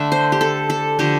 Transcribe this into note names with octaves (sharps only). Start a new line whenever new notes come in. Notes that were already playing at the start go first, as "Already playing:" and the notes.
Already playing: D3 A3 D4 E5
C5
G4
A4
A4
D3 F3 A3 G4